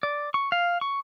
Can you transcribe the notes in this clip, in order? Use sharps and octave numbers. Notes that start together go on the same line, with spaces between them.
D5
C#6
F5
C#6